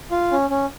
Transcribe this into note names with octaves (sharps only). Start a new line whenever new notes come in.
F4
C#4
C#4